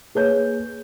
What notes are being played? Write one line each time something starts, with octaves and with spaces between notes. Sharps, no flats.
A#3 G#4 B4 C#5 G6